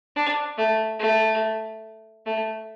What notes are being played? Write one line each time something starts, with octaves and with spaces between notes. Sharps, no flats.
D4
A3
A3
A3